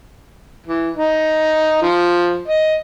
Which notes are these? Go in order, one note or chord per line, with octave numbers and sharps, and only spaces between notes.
E3
D#4
F3
D#5